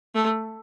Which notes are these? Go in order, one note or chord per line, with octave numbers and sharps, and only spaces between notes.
A3